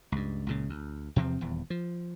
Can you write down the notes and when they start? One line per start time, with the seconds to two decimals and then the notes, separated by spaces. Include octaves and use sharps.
0.12 C#2 G2
0.47 C#2 A#2 C#3
0.69 D2
1.16 E2 C3 F3 C4
1.41 D#1 E2
1.70 F3